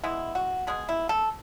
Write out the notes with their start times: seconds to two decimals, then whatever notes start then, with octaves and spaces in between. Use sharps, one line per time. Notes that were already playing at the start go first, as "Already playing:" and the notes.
0.04 E3 G#3 B3 E4
0.35 F#4
0.67 B2 G#3 B3 G#4
0.89 E4
1.09 A4